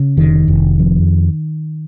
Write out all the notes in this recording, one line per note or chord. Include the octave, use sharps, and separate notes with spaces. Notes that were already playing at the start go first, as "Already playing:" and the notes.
Already playing: C#3
F1 D#3
F1
F2